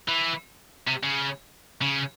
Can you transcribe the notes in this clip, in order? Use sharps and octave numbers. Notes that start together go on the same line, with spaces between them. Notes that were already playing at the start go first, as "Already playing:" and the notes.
E3
C3
C#3
C#3